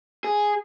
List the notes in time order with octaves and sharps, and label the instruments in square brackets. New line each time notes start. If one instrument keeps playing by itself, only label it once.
[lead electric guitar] G#4